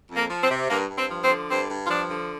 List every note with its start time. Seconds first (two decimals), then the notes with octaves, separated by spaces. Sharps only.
0.10 F2
0.16 A#3
0.30 F3
0.44 C4
0.51 C3
0.70 G2 A#3
0.90 G2
0.97 C4
1.10 F3
1.23 C4
1.30 D3
1.50 G2 C4
1.70 G2
1.86 F4
1.90 F3 D4
2.11 D3